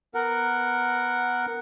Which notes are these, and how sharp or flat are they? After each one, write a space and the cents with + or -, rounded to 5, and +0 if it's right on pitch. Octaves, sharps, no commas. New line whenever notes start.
B3 +0 A#4 -5 F#5 +0